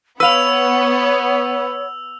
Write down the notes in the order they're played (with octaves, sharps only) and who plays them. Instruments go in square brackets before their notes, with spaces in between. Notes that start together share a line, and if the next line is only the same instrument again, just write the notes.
[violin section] B3 [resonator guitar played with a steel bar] B4 F5 [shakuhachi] C#5 [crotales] E6 F7